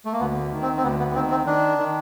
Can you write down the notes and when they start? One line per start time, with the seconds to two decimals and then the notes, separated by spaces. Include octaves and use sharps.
0.05 A3
0.13 A#3
0.20 D2 B3
0.51 D#3
0.62 C4
0.77 C4
0.83 D2 B3
0.99 B3
1.11 B3
1.15 D#3 C4
1.31 C4
1.46 D#3 D4
1.78 D#3